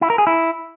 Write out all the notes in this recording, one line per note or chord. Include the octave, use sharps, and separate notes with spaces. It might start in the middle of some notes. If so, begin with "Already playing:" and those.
E4
A#4
G#4
E4